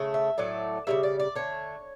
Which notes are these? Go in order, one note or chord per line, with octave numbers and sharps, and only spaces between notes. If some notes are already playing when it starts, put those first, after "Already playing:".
Already playing: C#3 A3
E5
A2 F#3 A3 D5
C#3 E3 G3 E5
D5
D5
D3 A3 C#5